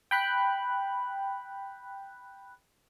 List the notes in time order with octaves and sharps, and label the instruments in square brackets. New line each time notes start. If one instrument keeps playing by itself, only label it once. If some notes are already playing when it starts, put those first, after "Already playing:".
[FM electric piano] G5 B5 F#6